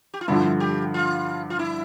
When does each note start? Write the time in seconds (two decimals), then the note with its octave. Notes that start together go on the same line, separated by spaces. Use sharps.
0.14 G4
0.21 F4
0.28 G2 D3 F3 E4
0.60 G4
0.94 F4
1.50 F4
1.59 E4